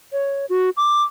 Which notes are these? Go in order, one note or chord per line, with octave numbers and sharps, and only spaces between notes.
C#5
F#4
D6